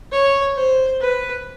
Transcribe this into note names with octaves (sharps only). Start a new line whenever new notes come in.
C#5
C5
B4